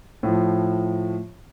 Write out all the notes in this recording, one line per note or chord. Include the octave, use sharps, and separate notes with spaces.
A2 F3